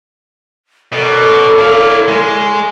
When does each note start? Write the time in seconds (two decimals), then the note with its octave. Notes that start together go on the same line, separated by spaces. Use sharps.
0.93 B2 A4 A#4 C#5 D5
1.59 E4 F5
2.08 G#3